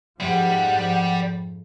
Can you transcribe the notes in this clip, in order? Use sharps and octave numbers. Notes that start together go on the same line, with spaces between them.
F2 G#2 F3 G3 F#5